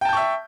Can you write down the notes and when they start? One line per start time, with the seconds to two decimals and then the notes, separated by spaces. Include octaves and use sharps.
0.01 G5
0.05 A5
0.09 G6
0.13 C#6
0.17 E5